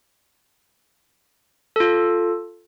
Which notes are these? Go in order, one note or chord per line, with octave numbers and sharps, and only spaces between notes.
F4 A4